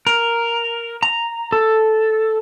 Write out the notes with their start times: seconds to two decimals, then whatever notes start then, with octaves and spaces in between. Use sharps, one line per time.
0.07 A#4
1.03 A#5
1.52 A4